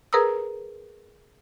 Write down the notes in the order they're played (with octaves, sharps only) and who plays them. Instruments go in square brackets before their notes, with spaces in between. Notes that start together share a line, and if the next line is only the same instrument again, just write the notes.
[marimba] G#4 A#4 B4 A#5 D#6 E6